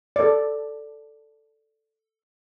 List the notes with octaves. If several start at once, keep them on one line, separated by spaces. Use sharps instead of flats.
A4 D5